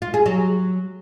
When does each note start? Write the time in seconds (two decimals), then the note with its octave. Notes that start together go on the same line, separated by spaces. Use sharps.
0.02 F4
0.14 G#4
0.26 F#3